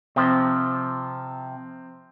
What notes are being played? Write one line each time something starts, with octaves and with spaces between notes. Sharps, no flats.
C3 F3 C4